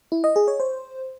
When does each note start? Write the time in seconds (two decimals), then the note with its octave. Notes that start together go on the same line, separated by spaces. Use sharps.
0.12 E4
0.24 D#5
0.36 G#4
0.48 C#5
0.60 C5